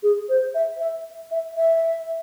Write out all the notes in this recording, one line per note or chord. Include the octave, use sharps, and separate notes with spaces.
G#4
C5
E5
E5
E5
E5